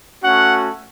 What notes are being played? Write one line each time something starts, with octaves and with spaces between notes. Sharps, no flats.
A3 C#4 F#4 F#5